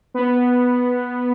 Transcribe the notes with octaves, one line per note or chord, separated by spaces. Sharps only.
B3